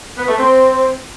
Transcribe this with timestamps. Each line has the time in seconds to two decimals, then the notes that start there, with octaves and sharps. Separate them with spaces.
0.18 B3
0.28 A3
0.39 C4